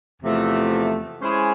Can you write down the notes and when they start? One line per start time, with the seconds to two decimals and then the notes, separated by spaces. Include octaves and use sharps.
0.22 E2 C3 F3 A3
1.22 G#3 C#4 E4 G#4 C5